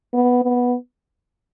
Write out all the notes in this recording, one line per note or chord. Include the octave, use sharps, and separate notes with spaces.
B3
B3